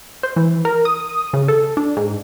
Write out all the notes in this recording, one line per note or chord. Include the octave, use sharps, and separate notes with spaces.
C5
E3
A#4
D#6
C#3
A4
D4
G#2